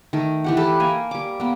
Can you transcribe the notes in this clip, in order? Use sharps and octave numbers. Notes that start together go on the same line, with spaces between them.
D#3 A3
E3 G4 F#5
G4 A4 B4 A5
A#3 F5 G#5
G3 D6
A#3 B3